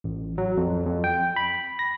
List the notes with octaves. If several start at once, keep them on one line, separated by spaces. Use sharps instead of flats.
A1
F#3
F2
F2
G5
B5
A#6